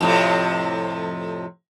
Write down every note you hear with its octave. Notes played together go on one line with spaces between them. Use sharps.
F2 A2 C3